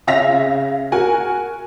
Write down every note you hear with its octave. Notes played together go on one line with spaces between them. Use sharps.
C#3 E5 F5 A#6 B6 F7
F#4 A#4 F#5 G#5